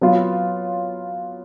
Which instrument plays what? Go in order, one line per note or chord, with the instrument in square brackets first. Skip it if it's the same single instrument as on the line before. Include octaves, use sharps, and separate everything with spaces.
[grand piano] F#3 B3 F4